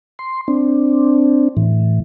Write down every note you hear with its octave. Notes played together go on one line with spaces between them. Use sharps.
C6
C4 D4
A2 E3